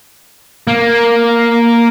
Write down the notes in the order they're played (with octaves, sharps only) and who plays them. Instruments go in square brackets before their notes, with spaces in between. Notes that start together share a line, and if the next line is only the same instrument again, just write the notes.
[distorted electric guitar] A#3